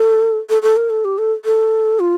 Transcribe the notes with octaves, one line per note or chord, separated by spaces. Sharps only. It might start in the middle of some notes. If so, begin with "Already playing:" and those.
Already playing: A4
A4
A4
A#4
A4
G4
A4
A4
F4